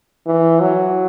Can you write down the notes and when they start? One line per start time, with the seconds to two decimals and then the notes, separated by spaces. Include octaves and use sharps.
0.27 E3
0.60 F#3